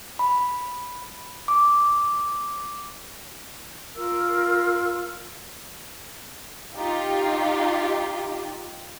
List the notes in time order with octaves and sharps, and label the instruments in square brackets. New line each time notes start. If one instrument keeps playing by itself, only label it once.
[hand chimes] B5
D6
[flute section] F4 A#4 E6
[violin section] D#4 F4 G4